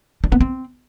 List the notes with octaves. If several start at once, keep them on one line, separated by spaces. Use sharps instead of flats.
D4
B3
C4